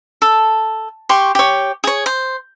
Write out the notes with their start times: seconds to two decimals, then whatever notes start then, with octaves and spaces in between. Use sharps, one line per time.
0.22 A4
1.09 G4 C6 C#6
1.35 G4 C#5
1.84 G#4 C#5
2.06 C5